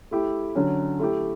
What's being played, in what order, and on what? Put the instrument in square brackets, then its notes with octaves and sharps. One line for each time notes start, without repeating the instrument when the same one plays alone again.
[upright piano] A3 E4 G4
D3 F#3 C#4
A3 E4 G4